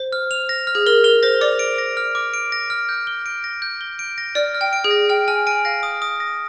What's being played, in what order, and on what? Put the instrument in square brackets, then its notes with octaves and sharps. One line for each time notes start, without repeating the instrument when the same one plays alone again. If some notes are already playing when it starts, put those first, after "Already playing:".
Already playing: [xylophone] C5
[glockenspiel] F6
F7
A#6
F6
[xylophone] G#4
[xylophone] A#4 [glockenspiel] F6
[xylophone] A#4 [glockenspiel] F7
[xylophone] C5 [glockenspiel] A#6
[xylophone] D5 [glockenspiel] D6
[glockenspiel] D7
A#6
F6
D6
D7
A#6
F6
G6
G7
D7
A#6
G6
G7
D7
A#6
[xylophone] D5 [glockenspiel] F6
[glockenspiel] F6
[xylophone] G5
[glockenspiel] D7
[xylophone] G#4
[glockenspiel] A#6
[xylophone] G5 [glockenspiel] F6
[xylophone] G#5 [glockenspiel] F6
[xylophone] G#5 [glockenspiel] D7
[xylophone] F5 [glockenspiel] A#6
[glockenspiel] D#6
D#6
A#6